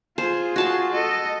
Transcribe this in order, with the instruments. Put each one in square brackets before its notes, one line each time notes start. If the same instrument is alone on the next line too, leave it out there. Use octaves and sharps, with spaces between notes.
[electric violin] F4 G#4 [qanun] C5
[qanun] F#4 A5 C6
[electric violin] A4 D#5